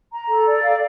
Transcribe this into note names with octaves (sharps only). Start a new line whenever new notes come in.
A#5
A4
D5
F5